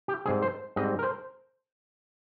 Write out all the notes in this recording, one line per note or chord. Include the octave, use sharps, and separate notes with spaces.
G4
G#2 G3 C4 G#4
C5
G#2 G3 C4 D#5
A#4
C5